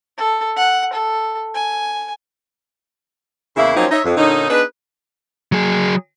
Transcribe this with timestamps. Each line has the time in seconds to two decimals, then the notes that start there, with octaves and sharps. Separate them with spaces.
0.17 A4
0.56 F#5
0.93 A4
1.54 G#5
3.56 E2 C#3 A#3 E4
3.77 F3 F#3 A#3 C4 C#4 D#4
3.91 D#4 C#5 E5
4.05 F2
4.17 A#2 D3 C#4 D#4
4.50 B3 D4 D#4 G#4 B4
5.52 F#3 G#4